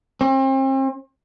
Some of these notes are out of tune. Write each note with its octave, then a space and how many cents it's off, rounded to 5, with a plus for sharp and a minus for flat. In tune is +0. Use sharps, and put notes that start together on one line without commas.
C4 +40